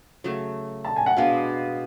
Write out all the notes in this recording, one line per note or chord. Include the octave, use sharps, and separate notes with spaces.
C#3 F#3 A3
A5
G#5
F#5
B2 G#3 B3 D4 F5